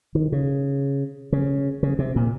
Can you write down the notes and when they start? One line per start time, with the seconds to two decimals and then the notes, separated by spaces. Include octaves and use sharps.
0.15 D#3
0.32 C#3
1.32 C#3
1.83 C#3
1.99 C3
2.16 A#2